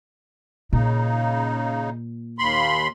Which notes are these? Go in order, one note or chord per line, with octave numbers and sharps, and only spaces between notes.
A#2 C#3 D#4
D#2 B5 C6